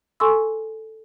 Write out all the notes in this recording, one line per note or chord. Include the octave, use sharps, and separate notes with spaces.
A4 G#5 C6 C#6 E6